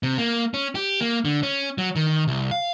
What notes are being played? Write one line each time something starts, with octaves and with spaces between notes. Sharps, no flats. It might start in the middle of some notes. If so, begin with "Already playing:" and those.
C3
A#3
C#4
G4
A#3
D3
C#4
F#3
D#3
C2
F5